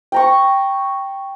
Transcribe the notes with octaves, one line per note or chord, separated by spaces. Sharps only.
G5 A#5 C#6